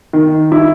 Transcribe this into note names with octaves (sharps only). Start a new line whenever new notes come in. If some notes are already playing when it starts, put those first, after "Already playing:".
D#3
E4